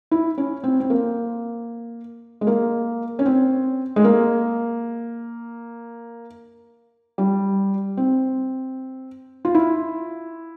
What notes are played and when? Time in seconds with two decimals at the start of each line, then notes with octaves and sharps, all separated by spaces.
0.11 E4
0.38 C#4
0.64 C4
0.80 C4
0.90 A#3
2.41 G#3
2.47 A#3
3.19 C#4
3.26 C4
3.96 G#3
4.04 A#3
7.18 G3
7.97 C4
9.45 F4
9.55 E4